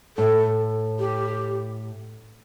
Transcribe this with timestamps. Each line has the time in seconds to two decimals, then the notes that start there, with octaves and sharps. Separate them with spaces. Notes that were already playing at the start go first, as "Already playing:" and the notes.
0.17 A2 A4
0.99 G4